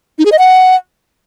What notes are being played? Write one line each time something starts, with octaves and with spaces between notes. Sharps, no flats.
D#4
G#4
D#5
F#5